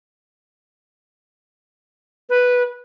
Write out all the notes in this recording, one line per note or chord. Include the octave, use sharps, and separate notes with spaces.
B4